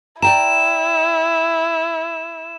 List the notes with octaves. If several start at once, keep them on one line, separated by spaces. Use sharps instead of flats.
E4 D5 G5 A#5 E7